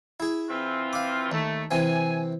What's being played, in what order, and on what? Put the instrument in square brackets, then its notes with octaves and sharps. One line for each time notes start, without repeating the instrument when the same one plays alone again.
[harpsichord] E4 G#4
[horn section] E3 C4 F4
[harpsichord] F5 D6
[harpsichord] D#2 [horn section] A3
[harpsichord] C3 E3 C4 [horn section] G#5